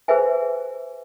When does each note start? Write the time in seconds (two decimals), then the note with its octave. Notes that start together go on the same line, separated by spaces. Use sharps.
0.08 G#4 B4 C5 E5 G#5